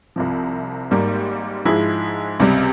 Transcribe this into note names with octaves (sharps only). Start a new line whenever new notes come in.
C2 C3 F3
G#1 G#2 G3 A#3
G#2 F3 G#3 E4 G#4
C#2 C3 G3